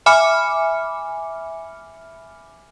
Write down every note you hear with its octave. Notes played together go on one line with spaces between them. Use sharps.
E5 G#5 B5 D6 F6 C#7